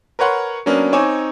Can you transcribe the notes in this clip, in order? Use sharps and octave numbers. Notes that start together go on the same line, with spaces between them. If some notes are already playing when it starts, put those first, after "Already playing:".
A#4 B4 C#5 F#5 C6
F#3 A#3 B3 C#4 D4
C4 D#4 C#5 G#5 D6 E7